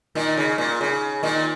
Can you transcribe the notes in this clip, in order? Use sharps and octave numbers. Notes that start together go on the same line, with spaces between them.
A#2 D#3
C#3
A#2
C#3
A#2 D#3